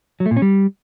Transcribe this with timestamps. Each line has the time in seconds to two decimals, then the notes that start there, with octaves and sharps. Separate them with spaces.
0.20 F#3
0.26 A3
0.31 A#2
0.37 C#4
0.42 G3